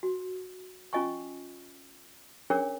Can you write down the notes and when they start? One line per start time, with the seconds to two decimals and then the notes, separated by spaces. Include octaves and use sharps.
0.03 F#4
0.93 C#4 F4 D#5 G#5 C#6
2.50 C#4 D4 G#4 A#4 C#5 D6